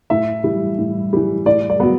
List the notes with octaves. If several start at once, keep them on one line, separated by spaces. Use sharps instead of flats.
A2 E5
E3 G3
A2
E3 G3
A2 D5
D5
F#3 B3